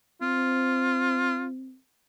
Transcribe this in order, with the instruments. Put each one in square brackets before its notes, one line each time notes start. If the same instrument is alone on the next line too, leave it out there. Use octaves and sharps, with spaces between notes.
[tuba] C4 [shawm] F4